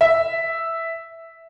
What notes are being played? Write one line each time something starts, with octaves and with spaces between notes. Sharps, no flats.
E5